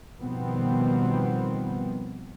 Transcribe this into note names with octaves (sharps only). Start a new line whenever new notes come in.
B2 D#3 F3 G3 B3 C4